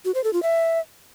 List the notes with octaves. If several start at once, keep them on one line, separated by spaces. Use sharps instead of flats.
F#4
C5
A4
F4
E5